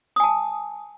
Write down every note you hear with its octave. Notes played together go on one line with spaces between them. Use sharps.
G#5 A5 D#6